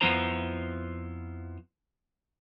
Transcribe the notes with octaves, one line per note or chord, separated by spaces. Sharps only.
F2 F3 B3 E4 C5 A#5